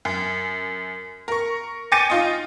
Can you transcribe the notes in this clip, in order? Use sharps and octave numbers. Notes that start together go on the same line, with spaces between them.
F#2
A#4 C#6
G5 G#5 D6 A6 C#7 D#7
D#4 F4 D#5